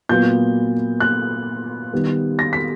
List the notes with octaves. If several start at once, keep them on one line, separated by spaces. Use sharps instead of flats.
A#2 F#3 B3 G6
F#6
D#3 G3 B3
A#6
B6